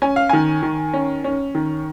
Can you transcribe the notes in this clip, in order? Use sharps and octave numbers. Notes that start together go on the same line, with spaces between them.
C#4 G#5
F5
D#3 G#5
D#3
C#4
C#4
D#3